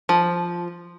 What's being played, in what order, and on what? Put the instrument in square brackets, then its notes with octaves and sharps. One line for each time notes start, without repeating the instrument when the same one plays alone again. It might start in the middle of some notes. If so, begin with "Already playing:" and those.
[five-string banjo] F3